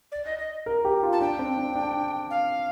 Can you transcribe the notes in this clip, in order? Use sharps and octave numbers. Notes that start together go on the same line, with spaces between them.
D5
D#5
D#5
A#4
G4
F4
A5
D4 G5
C4
D4
D4
F5